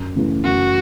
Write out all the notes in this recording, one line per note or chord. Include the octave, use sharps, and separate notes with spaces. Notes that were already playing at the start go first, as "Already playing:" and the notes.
Already playing: F#2
C#3 E3 A3
F#2 F#4